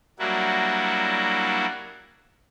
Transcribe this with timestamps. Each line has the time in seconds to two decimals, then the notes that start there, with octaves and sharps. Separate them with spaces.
0.19 F#3 G3 A#3 D4 E4 F#4